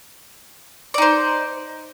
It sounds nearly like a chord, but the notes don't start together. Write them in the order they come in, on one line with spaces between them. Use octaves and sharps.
D5 D#4 C5